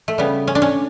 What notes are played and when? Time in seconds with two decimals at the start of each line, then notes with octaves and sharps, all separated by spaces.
0.08 A3
0.18 C#3 G3 B3
0.47 C#4
0.55 D4
0.62 C#4